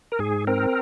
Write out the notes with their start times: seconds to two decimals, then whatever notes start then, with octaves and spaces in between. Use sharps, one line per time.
0.12 A#4
0.19 G#2 G#4
0.47 C4 A#4